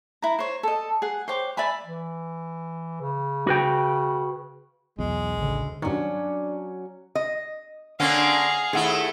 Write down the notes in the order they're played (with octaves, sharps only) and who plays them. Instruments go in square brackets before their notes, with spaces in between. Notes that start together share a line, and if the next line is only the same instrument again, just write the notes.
[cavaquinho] E4 A#5
C5 C#5
A4 D#5
G#4 F#5
C5 C#5 G5 D6
D5 E5 G#5 B5
[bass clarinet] E3
C#3
[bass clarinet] C#3 [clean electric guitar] F#4 B4 G5
[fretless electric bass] B1 E2 [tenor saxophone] G#3
[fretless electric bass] A1 [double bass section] D2 C#3
[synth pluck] G2 D#3 [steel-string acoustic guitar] F#3 C#4 [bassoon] D4
[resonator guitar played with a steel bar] D#5
[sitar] D3 A#3 C#4 [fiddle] G#4 F5 [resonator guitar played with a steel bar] F#5
[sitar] D#2 A3 E4 [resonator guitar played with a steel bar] G#4 A4 F#5